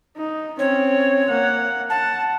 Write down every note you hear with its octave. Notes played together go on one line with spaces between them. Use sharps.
D#4
C4 C#4 C#5
A#3 F#5
F#5 A5